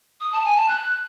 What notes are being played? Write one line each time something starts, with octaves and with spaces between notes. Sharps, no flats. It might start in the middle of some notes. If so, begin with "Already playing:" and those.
D#6
A5
G#5
A5
F#6